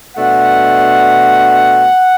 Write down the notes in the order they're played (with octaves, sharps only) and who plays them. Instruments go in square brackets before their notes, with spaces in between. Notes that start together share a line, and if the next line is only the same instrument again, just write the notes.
[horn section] B2 A3 D4 F#5